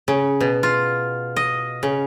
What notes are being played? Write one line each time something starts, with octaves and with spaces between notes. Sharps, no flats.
C#3
B2
F4
D#5
C#3